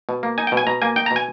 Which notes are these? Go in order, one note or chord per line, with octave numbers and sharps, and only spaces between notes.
B2
A#3
D#4 G#5
G5
B2
G#5
B2 A#5
A#3 G#5
D#4 G5
A#5
B2
G#5